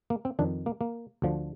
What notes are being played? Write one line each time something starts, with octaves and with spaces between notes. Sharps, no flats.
A#3
C4
F2 D#3 D4
A#3
A#3
D2 D3 F3